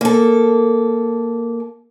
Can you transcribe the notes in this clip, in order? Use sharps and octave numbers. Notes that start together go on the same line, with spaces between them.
A#3 A4